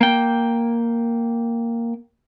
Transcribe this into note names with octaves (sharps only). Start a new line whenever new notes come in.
A#3 G5